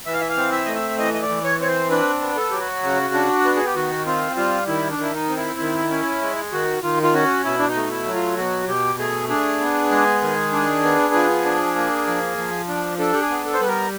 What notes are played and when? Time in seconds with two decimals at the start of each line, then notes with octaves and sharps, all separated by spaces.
0.06 E3 E5
0.13 F5
0.21 E5
0.29 F5
0.37 C4
0.52 E5
0.66 A3 D#5
0.75 E5
0.98 E3 D#5
1.14 D#5
1.22 D5
1.29 E3
1.44 C#5
1.60 C4 C#5
1.68 C5
1.91 D4 B4
2.21 B3
2.37 A4
2.51 F#3 G4
2.60 F#4
2.83 C#3
3.14 D4
3.45 B3
3.56 G#4
3.66 G4
3.75 D#3 F#4
4.06 C4 F4
4.36 G3 F4
4.68 D#3 E4
4.91 D4
4.98 D#3 E4
5.14 D#4
5.29 C4
5.37 E4
5.60 D#3
5.91 C#4
6.22 G#3
6.52 D#3 F#4
6.83 D#3 F4
7.03 F4
7.14 C#4 F#4
7.44 B2 E4
7.59 D4
7.68 D#4
7.75 A3
7.91 E4
8.06 F#3
8.14 F4
8.37 B2 F#4
8.67 B2 G4
8.99 A3 G#4
9.29 D4 G#4
9.60 B3
9.91 G#3
10.22 D#3
10.52 D4
10.83 B3
11.14 F3
11.45 D4
11.76 A#3
12.07 F3
12.37 F3
12.68 D4
12.99 D4 A4
13.13 G4
13.22 G#4
13.30 B3
13.45 A4
13.54 C5
13.60 G3 B4
13.68 A#4